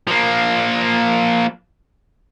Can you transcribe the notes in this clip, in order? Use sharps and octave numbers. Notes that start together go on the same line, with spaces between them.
F3 A#3